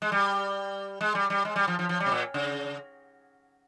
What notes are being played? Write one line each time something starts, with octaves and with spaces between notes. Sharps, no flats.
G#3
G3
G#3
G3
G3
G#3
G3
F3
F3
F3
G3
C3
A#2
C#3